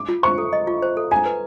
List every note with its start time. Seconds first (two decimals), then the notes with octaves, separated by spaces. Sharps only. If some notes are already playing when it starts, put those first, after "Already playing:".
Already playing: D6
0.09 F4
0.23 C5 C#6
0.38 A4
0.53 D#5
0.67 F4
0.83 C5
0.97 A4
1.11 G#5 A#5
1.26 B4